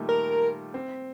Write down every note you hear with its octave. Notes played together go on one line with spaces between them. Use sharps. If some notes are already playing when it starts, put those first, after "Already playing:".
Already playing: A#2 D#3 G3 A3
A#4
C4